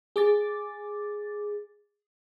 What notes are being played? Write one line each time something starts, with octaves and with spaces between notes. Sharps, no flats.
G#4 D6 A6